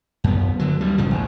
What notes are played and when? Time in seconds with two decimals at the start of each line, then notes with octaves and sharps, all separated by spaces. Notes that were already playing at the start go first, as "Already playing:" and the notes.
0.24 F#2 B3
0.59 D3 F#3
0.81 D2 G3
0.98 G#1 G2 C#3 F3
1.11 A1 D#2 G#2